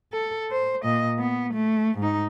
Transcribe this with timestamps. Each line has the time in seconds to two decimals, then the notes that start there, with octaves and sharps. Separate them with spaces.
0.13 A4
0.51 C5
0.83 A#2 D#5
1.19 B3
1.54 A3
1.98 G#2 D#4